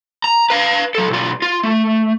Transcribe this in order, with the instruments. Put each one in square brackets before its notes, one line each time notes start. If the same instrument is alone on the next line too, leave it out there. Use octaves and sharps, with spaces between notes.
[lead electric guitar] A#5
B4 F5
F#3 A4
B1 F4
F4
A3